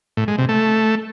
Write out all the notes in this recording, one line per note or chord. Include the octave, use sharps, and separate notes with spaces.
A2
G#3
C3
A3